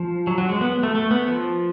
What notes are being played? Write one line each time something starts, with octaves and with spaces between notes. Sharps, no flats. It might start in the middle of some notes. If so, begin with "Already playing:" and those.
Already playing: F3
F#3
F#3
G#3
B3
A3
A3
B3
F3